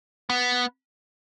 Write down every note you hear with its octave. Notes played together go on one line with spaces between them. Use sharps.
B3